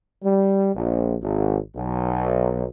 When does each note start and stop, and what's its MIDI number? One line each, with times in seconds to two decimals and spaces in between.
0.24 0.71 55
0.76 1.16 34
1.22 1.59 32
1.76 2.66 35